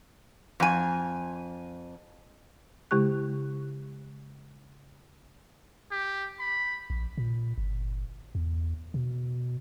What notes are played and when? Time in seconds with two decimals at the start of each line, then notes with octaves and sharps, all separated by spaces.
0.60 F2 G#5
2.91 C#3 G#3 E4 G4 C#6 F#6
5.91 G4
6.40 B5
6.90 A#1
7.18 A#2
7.58 G1
8.35 E2
8.94 B2